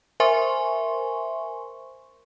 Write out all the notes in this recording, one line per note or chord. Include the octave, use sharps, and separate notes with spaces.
A#4 C5 E5 G#5 C6 C#6